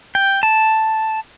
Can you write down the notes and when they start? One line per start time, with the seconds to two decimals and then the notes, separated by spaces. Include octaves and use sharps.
0.15 G5
0.43 A5